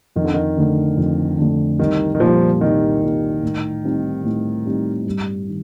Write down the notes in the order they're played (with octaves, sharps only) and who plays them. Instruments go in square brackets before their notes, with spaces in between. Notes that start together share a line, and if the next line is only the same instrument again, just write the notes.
[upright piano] F2 [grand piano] D#3
[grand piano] D3
D#3
[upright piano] D3 A3
F2
D3 A3
[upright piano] C2 [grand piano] D#3
[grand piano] D#3
[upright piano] A#2 G3 [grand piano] F3
[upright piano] C2 [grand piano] D#3
[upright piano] A#2 G3
A2
G3 C4 D#4
A2
G3 C4 D#4
G2
D#3